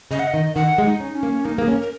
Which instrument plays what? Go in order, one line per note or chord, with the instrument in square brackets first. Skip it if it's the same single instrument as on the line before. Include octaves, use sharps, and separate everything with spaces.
[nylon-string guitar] C#3 [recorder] D#5
[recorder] F#5
D#5
[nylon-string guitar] D#3
[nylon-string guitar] D#3 [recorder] F#5
[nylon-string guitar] G#3
[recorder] D#4
[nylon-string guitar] C#4
[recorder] C#4
[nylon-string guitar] A#3
[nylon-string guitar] A#3 [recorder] D#4
[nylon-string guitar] A#3 [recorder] G#4
[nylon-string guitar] C#4 [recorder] A#4
[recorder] A#4